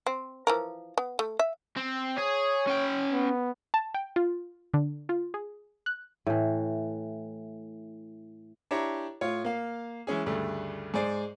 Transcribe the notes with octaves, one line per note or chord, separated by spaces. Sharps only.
C4
E3 F3 A#4
B3
A3
E5
C4
G#4 C#5
C#4 G5
B3
A5
G5
F4
D3
F4
G#4
F#6
A2 E3
D4 E4 G4 C#5 A#5
A2 F4 C#5
A#3 F5
E3 G#3 C#4 G#4
D2 G2 C#3 A3
G#2 G#4 C5 D5